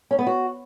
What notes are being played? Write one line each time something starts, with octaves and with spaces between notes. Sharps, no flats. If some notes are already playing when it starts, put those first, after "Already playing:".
C#4
B3
F#4